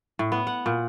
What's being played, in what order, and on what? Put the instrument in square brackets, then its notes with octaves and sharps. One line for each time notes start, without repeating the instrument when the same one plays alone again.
[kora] A2
B3
F#5
A#2